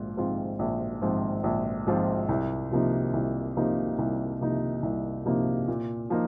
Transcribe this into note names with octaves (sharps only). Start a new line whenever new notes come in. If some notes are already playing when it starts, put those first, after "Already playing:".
Already playing: A#1 G#2 F4
G#2 F3 C4 F4
A#1
G#2 F3 C4 F4
A#1
G#2 F3 C4 F4
C2
C3 F3 A#3 D#4
C2
C3 F3 A#3 D#4
C2
C3 F3 A#3 D#4
C2
C3 F3 A#3 D#4
A#2
F3 A#3 D#4